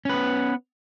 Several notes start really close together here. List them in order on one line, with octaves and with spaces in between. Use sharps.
C#4 B4 B3